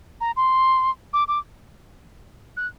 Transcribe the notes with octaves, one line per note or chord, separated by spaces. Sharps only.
A#5
C6
D6
D6
F#6